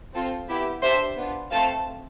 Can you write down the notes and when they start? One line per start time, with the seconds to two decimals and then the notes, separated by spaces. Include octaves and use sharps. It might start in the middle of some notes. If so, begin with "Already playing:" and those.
0.14 C4 F4 A4
0.49 B3 E4 G4
0.82 D4 G4 C5 E5
1.16 B3 D4 F4
1.51 A3 C4 F4 A4 F5 A5